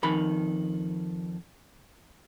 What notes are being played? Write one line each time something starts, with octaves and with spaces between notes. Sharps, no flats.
F2 D#3 B5